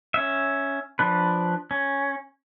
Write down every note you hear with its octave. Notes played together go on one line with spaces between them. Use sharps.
C#4 E5
F3 D4 B4
C#4